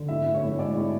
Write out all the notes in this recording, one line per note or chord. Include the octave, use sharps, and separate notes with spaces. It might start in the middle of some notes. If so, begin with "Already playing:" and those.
Already playing: D3
A2 E5
A2
C#5
A2
G#3 D5
A2